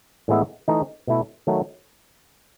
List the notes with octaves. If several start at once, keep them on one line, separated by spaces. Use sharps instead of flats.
A2 E3 G#3 B3 E4
E3 A3 D#4
B2 A3 E4
D#3 F#3 A3